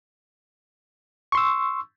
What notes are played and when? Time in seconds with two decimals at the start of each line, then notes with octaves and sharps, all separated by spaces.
1.32 C#6
1.35 C6
1.37 E6